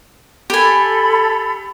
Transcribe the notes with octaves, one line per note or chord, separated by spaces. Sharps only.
G4 A4 G#5 B5